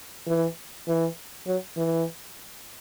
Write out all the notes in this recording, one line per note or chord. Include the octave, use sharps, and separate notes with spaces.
E3
E3
F#3
E3